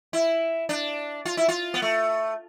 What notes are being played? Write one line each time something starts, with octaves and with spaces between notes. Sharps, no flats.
E4
D4
F4
E4
F4
B3
A3